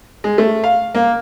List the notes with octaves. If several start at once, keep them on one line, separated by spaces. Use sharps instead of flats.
G#3
A3
F5
A#3